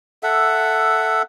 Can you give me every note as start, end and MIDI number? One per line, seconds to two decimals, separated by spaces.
0.23 1.22 69
0.23 1.22 76
0.23 1.22 78